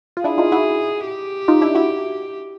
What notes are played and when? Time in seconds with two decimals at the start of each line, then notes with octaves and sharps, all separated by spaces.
0.17 F4
0.24 D4 E4 G#4
0.38 D#4 F4
0.52 E4 F#4
1.07 G4
1.48 D#4 F4
1.61 D4 E4
1.75 E4 F#4